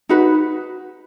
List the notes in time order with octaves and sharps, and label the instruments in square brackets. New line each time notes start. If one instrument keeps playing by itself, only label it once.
[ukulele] D#4 F#4 B4